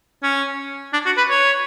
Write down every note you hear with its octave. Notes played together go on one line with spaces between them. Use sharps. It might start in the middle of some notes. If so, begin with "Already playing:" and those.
C#4
D4
F#4
B4
C#5